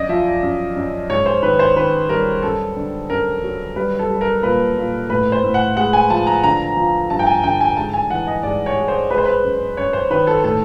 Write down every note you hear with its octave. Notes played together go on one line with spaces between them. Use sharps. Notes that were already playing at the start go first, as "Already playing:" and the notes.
Already playing: F#2 D5 D#5
F3 E5
F#2
F#2
G#2 C#5
C5
D#3 B4
C5
D#3 B4
G3 A#4
F#2 A4
D3
F#2 A#4
F#3
G3 B4
A4
G3
A#4
A#2 B4
A#2
A2 B4
C5
A2
F#5
G#3 F#5
G#5
F3 A5
A#5
D3 A#5
F3
G2 A5
G5
G#5
D3 G5
G#5
G#2 A5
G#5
E3 F#5
D#5
G#2 D5
C#5
G#3
C5
G#3 B4
C5
B4
F#2
F#2 C#5
C5
D#3 B4
A4
A2 A4